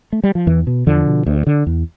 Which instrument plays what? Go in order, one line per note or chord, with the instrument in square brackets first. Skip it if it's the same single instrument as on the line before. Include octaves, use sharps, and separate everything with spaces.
[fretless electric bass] A3
G3
F3
E2 E3
B2
E2 D3 F3
B2
D2
D3
E2